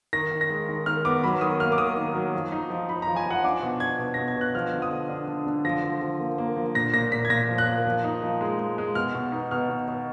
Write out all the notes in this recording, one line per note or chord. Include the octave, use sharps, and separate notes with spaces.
D#3 A#6
D#3
A#6
G#3
D#3
D#3 F6
B3 D6
F#3 B5
D#3 D#6
A#3 F6
D6
D#3 D#6
D#3
F#3
F3
D#4
F3
F3 B5
A#5
F3
G#5
F3 F#5
D4 D6
B2
D4 G#6
B2
B2 A#6
G#6
B2 F#6
F3 F6
D3
D#6
D3
D4
D3
D3
F3 A#6
F3
F3
A#3
A#3
F3
A#2 A#6
A#2 A#6
A#2 B6
G#6
A#2 A#6
F3
F#6
A#3
F3
D#4
F3
G#3
G#3
G#3
B2 F6
B2
D#4
B2 F6
B2
B2